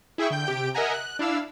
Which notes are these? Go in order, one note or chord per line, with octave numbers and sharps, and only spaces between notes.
E4 G#4 E5 G5 C#6
D3 G5 G6
C3 G4 G5 D7
A#4 D#5 E5 F#5 G#5 A#5
F#6
D4 E4 F5 E6